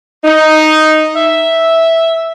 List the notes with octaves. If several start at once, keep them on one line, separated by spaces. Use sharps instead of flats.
D#4
E5